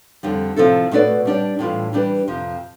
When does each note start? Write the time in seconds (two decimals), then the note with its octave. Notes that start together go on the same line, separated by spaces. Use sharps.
0.23 F2 D3 G3
0.56 C3 F3 C4 E4 A4
0.91 B2 A3 E4 B4 D5
1.25 G3 D4 G4 D5
1.59 A2 E3 G3 D4 F4
1.93 E3 G3 D4 G4 B4
2.28 F2 C3 F3